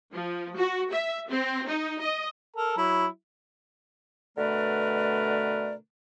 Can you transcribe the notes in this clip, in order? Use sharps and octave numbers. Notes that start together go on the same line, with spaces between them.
F3
F#4
E5
C4
D#4
D#5
A4 A#4 A#5
F#3 E4
B2 D3 A3 A#4 B4 D5